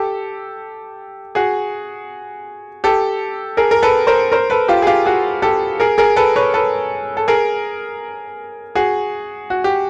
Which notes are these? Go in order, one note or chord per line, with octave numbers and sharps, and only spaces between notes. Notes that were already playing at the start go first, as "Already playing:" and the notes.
Already playing: G4 A4
F#4 G#4
G4 A4
G#4 A#4
A#4
A4 B4
A#4 C5
A#4 C5
A4 B4
F4 G4
G#4
F4 G4
F#4 G#4
G4 A4
G#4 A#4
G#4 A#4
A4 B4
B4 C#5
A4 B4
A4
G#4 A#4
F#4 G#4
F#4
G4